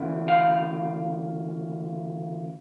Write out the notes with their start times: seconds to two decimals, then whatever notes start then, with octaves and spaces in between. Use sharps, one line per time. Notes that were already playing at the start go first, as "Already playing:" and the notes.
Already playing: D2 C#3 E3
0.28 F5